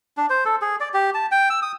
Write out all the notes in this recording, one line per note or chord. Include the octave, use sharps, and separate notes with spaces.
D4
C5
A4
G#4
D5
G4
A5
G5
E6
D#6